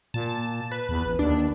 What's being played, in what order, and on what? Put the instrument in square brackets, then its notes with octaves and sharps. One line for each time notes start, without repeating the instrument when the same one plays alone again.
[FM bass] A#2 [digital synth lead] A5
[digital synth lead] B4
[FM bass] E2
A1
[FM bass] D#2 [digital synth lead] D4